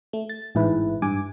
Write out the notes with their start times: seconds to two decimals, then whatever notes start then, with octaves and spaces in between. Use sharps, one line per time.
0.13 A3
0.29 A6
0.55 A1 G#2 E4 B4
1.02 G2 G#5 D6